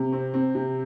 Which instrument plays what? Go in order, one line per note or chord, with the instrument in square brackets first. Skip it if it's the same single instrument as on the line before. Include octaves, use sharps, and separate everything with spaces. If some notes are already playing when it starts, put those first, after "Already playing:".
Already playing: [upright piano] C3
C4
C4
C3